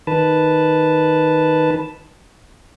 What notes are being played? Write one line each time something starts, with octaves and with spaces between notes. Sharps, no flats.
D#3 B4 A5